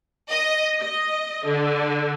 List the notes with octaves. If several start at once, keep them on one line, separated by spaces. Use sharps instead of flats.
D#5
D#5
D3